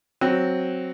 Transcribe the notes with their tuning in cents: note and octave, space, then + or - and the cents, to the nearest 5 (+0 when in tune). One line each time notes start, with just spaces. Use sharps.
F#3 +0 C4 +0